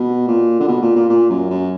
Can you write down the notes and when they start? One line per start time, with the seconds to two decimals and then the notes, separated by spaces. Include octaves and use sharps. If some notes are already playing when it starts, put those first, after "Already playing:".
Already playing: B2
0.27 A#2
0.60 D3
0.67 B2
0.81 A#2
0.95 A#2
1.09 A#2
1.29 F#2
1.50 F#2